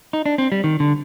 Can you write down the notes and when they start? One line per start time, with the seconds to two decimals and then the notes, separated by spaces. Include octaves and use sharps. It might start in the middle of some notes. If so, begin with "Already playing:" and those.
0.13 D#4
0.26 D4
0.38 C4
0.52 G3
0.64 D#3
0.80 D3